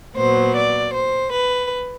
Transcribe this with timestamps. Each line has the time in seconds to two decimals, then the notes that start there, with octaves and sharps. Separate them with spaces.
0.16 A#2 F#3 B3 C5
0.56 D5
0.94 C5
1.32 B4